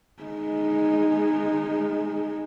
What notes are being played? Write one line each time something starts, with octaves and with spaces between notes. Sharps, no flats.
G#3 D#4